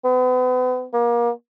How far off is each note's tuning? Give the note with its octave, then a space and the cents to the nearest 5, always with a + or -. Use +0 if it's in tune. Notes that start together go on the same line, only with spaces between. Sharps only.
B3 +40
A#3 +30